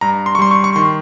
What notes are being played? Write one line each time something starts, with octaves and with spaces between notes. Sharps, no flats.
G2 A#5
C6
C#6
G3 C6
C#6
C#6
D#3 C6